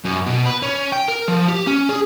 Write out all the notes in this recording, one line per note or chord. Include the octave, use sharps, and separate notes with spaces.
F#2
B2
B4
C#4
G5
A#4
F3
G4
C#4
G#4